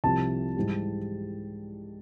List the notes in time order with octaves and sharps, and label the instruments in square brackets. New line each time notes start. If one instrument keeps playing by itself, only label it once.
[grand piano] C2 C3 F3 A5
G#2 E3 G3